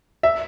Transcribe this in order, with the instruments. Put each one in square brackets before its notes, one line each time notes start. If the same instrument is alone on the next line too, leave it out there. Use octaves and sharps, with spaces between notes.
[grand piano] E5